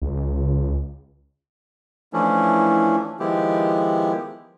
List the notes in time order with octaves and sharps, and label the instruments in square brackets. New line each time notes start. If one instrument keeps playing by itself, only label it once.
[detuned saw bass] C#2
[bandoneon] E3 F3 A3 C#4 D4 E4
D#3 F3 G#3 B3 E4 G4